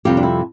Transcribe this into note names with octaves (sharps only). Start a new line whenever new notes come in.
F2 C3 G3 G4
D4
E4